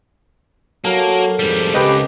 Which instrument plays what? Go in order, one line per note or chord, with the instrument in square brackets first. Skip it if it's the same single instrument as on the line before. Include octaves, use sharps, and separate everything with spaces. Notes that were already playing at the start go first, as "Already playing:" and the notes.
[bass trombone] F#3 [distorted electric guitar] A#3 [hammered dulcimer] A4 A#4
[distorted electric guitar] F2 G3 [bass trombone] G#2
[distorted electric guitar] C#2 [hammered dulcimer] C3 [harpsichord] G4 B4 D#5